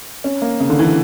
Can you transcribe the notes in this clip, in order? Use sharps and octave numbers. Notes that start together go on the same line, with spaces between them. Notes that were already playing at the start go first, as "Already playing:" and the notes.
C#4
A#3
C#3
D3
E3